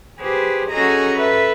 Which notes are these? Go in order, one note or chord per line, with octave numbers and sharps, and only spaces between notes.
G4 G#4 B4 C5
C#4 F#4 G#4 A4 D#5 A#5
A4 B4 E5